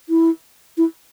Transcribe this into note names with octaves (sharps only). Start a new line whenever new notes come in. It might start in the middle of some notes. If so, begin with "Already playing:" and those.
E4
E4